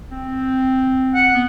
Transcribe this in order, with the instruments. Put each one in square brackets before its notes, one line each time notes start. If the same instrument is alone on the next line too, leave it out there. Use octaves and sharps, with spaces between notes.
[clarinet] C4
[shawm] F#5
[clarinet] B3